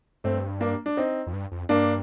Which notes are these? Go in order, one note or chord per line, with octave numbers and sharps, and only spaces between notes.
G2 A3 C4
A#3 D4
D4
C4 D#4
F2
G2
F2
G2 A#3 D4